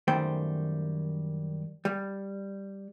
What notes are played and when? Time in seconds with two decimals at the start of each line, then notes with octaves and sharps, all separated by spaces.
0.08 F#2 D#3 G3 A3 C5 G5
1.85 G3